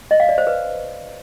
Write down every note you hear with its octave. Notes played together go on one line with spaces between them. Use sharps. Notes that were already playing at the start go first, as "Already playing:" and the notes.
D#5
F5
D5
C5
B4